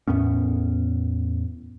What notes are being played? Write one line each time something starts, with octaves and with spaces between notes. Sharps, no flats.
E2 A2 B3 C#4